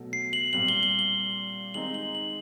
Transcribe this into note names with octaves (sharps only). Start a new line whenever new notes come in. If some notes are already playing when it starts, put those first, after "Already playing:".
Already playing: B2 F#3 A3
C7
F#7
A#2 G3 C4 F#7
G7
G7
G7
D#3 G#3 C4 D#4 F#7
F#7
F#7